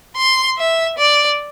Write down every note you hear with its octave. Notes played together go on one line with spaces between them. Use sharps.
C6
E5
D5